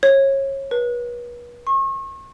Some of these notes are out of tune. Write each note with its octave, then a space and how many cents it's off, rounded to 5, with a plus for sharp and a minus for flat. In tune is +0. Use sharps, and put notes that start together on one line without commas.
C#5 -30
B4 -40
C#6 -40